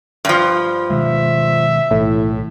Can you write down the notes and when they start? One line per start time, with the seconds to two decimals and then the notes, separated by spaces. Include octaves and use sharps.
0.25 G2 F3
0.90 B2 D#3 G#3 E5
1.91 B1 A2 E3